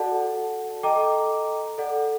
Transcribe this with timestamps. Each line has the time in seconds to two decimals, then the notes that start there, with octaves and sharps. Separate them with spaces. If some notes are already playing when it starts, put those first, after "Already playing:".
Already playing: F#4 A4 D5 F#5 A5
0.83 A4 D#5 G5 A#5 D6
1.78 A4 D5 F#5